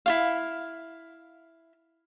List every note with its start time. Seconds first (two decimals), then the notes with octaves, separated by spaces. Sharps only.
0.06 E4 F4 F5